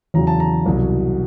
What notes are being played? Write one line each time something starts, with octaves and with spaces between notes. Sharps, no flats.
E2 C#3 F#3 A#5
A5
A#5
C2 B2 F#3